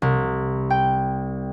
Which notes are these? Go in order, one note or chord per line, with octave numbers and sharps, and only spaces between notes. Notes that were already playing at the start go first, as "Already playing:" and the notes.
C2
G5